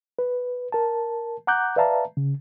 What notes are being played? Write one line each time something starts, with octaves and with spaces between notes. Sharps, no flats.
B4
A#4 A5
F#5 A#5 D6 F#6 G6
B4 D5 E5 F5 A5 A#5
C#3